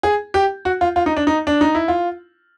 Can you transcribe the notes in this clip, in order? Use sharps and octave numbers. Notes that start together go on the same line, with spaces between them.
G#4
G4
F#4
F4
F4
D#4
D4
D#4
D4
D#4
E4
F4